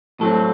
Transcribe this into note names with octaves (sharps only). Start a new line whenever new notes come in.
A2 F#3 C4 A4